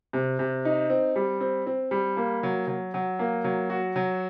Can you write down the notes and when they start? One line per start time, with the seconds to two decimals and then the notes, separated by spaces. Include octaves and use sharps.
0.13 C3
0.39 C3
0.65 D#4
0.90 C4
1.16 G3
1.40 C4
1.67 C4
1.91 G3
2.17 A#3
2.43 F#3
2.67 F#3
2.94 F#3
3.19 A#3
3.44 F#3
3.70 F#4
3.96 F#3